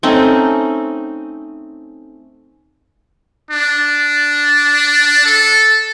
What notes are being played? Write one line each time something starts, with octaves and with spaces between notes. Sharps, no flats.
A3 C4 C#4 D#4
D4
A4